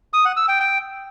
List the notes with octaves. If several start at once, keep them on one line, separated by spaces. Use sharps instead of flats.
D#6
F#5
E6
G5
G5